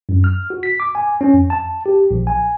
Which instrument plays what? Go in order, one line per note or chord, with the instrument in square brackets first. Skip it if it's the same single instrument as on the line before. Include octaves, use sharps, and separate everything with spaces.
[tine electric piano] F#2
F6
F#4
B6
D6
G#5
C#4
F2
A5
G4
A#1
G#5